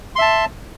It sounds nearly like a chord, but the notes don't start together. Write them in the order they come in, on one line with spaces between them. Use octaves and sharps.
C6 E5 A5